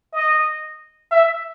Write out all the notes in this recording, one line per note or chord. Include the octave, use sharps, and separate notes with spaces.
D#5
E5